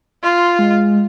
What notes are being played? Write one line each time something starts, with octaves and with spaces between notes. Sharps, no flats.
F4 C6
G#3